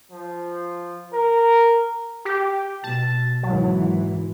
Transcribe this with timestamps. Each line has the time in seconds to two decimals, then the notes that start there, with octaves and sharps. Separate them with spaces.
0.11 F3
1.14 A#4
2.25 G4
2.84 B2 A5
3.43 G#1 E3 F#3